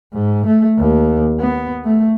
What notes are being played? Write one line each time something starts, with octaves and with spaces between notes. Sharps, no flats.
G#2
A3
D#2
B3
A3